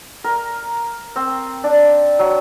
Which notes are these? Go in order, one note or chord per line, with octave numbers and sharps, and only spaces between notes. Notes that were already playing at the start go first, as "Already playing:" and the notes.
A#4
C4
D4
F#3